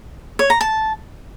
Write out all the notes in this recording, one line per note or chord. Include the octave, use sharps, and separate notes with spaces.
C#5
A#5
A5